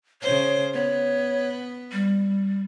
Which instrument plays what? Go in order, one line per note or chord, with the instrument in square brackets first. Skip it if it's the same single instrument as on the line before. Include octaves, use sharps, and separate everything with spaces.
[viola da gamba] C#3 C5 [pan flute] C#5
[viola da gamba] B3 [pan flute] C#5
[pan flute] G3